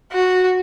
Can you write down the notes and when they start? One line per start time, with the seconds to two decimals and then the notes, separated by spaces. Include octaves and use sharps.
0.12 F#4